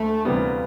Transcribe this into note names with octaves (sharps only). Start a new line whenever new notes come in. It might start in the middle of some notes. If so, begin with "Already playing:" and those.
Already playing: D2 A3
D2 C3 E3 G3 A#3 B3